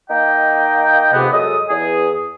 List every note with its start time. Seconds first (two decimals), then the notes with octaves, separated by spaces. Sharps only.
0.10 A#3 D#4 D#5 G5
1.13 F2 G#2 C3 B3
1.32 F#2 G#3 A4 D#6
1.69 E2 G#4